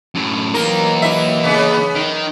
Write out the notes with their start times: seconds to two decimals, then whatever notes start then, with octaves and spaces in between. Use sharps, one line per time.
0.15 F#2 A2
0.54 E3 F#3 A#3 D#4 A#4
1.02 E4 E5
1.44 C#3 B3
1.95 D#3